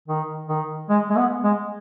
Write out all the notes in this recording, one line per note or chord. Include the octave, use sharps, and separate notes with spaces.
D#3
D#3
G#3
G#3
B3
G#3